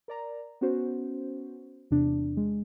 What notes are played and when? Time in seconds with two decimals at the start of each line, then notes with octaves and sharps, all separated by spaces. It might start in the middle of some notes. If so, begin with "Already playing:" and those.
0.08 A#4 D5 A#5
0.61 B3 C#4 F#4 C5
1.91 E2 C3 D4
2.37 G#3